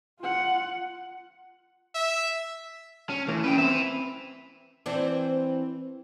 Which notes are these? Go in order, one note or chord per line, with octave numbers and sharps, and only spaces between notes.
F4 F#5
E5
C#4
E3 A3 A#3
C#4 B4 G5
C4 B4 C5 E5
E3 C4 D4